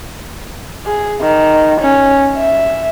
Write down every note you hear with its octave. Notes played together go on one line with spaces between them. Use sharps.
G#4
D#3
C#4
E5